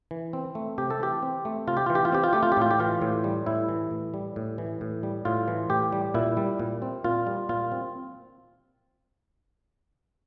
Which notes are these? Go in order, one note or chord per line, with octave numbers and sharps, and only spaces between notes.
E3
C4
A3
C3 G4
A4
E3 G4
C4
A3
C3 F4
G4
E3 F4
G4
F4
C4 G4
F4
A3 G4
F4
G4
A2 F4
G4
E3 F4
A2
G3
A2 E4
E3
A2
G3
A2
E3
A2
G3
A2 F4
E3
A2 G4
G3
A#2 E4
G3
A#2
C4
A#2 F4
G3
A#2 F4
C4